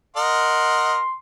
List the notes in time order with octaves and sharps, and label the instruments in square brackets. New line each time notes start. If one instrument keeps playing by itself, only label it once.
[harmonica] A#4 D#5 F#5 [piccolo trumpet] C6